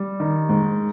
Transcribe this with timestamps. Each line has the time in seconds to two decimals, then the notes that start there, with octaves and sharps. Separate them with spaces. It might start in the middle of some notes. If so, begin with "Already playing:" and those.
Already playing: G3
0.20 D#3
0.49 G#2